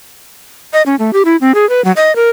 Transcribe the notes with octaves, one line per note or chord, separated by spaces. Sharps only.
D#5
C#4
A3
G4
E4
C4
G#4
B4
F#3
D#5
A#4